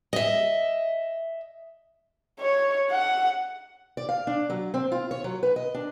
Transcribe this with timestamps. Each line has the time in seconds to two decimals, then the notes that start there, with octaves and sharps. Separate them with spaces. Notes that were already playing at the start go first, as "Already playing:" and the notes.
0.13 D#5 E5
2.40 C#5
2.91 F#5
3.97 D5
4.09 F5
4.27 D4
4.50 F#3
4.74 C4
4.92 F4
5.11 C#5
5.24 F#3
5.43 B4
5.56 D#5
5.74 D4